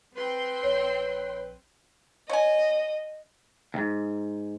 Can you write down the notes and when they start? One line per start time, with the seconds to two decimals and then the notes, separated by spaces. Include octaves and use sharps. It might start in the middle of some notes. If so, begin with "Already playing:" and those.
0.15 C4 B4 G5 C6
0.63 A#1 C#5
2.30 C#5 D#5 G#5
3.74 D#2 G#2